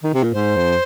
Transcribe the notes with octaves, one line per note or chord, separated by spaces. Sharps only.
D#3
C3
A#2
G#2 C5
F2